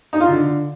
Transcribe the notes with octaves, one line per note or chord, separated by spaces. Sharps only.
D#4
F4
D3